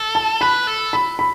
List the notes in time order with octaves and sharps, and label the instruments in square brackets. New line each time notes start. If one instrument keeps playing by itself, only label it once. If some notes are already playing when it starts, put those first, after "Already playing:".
Already playing: [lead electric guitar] A4
[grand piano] A5
[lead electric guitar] B4 [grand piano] B5
[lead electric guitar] A4
[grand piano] B5
B5